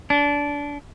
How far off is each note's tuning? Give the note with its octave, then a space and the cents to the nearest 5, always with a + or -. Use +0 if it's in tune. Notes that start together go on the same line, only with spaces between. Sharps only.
D4 -25